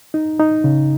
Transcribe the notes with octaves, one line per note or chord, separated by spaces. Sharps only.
D#4
D#4
C#3